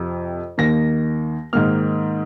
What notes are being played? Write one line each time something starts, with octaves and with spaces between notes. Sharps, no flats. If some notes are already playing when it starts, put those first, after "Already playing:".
Already playing: F2 C3 F3
D#2 D#3 A#3 A#6
G#2 D#3 A#3 F6